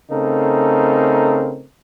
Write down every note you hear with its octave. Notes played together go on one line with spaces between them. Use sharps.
C#3 A3 C4 D#4 A4 A#4